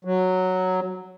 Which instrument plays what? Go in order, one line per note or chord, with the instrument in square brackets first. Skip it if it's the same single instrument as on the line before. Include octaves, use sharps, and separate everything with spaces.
[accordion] F#3